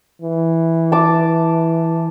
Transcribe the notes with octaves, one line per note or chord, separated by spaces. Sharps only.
E3
A5 D6